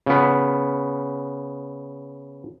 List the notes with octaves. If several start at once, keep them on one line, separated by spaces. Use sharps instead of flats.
C#3 B3